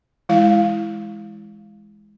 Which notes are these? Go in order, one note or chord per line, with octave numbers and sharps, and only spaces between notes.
E3 G#3 E4 F5